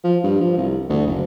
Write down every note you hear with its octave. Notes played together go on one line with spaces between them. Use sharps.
F3
G2
F3
C2
D2
F#1